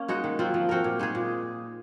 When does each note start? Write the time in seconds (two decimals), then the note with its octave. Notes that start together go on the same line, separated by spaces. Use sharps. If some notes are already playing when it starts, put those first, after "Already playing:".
Already playing: A#3 C#4
0.08 G#3 D#4 F#4
0.24 D#3
0.39 F#3 C4 F4
0.54 F3
0.69 C4 F#4 A#4
0.84 A#2
0.99 G#3 D#4 G#4
1.15 A#2